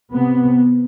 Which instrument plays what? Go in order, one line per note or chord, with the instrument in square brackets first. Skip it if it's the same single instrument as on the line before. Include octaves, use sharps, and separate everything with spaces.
[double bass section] C3 B3